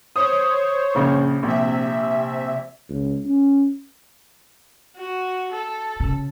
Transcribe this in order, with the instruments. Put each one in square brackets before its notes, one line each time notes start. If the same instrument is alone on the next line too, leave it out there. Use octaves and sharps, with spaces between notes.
[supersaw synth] C5 C#5 [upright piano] D#6
[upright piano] A#1 C#3
[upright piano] A#1 [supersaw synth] C3 E5
[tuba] C#2
C#4
[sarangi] F#4
A4
[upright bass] C#3